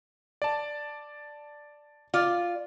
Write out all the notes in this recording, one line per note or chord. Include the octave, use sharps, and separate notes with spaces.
D5 A5
F4 D5